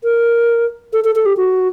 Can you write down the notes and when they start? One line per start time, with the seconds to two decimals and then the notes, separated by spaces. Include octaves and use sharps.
0.04 A#4
0.93 A4
1.04 A4
1.15 A4
1.26 G4
1.37 F#4